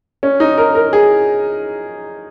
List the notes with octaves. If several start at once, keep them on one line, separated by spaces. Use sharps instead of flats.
C#4
D#4
A#4
A#4
G#4